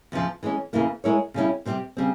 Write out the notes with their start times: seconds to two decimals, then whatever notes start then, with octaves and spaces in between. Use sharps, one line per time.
0.12 E2 C#3 F3
0.43 E3 G#3 C#4
0.73 E2 C#3 E3 A#3 E4
1.04 G#3 E4 A#4 C#5
1.34 C#3 G3 C#4 E4
1.65 C3 G3 C4 G4
1.97 C#3 G3 C4